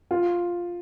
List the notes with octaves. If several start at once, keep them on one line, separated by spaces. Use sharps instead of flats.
F4